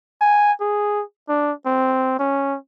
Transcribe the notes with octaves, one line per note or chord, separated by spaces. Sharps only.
G#5
G#4
D4
C4
C#4